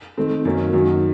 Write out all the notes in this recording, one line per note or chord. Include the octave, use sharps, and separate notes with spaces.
D#3 A3 C4
F#2 D#3 A#3 C#4
F#2 D#3 F#3